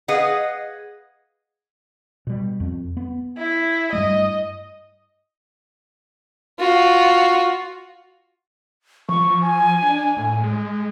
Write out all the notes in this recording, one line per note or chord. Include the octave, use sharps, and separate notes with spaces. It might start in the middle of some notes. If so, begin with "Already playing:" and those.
G#4 B4 D#5 F5 F#5
B2 G3
F2
B3
E4
G2 G3 A3 D#5
F4 F#4
F3 C#6
G#5
D4
A2
G#3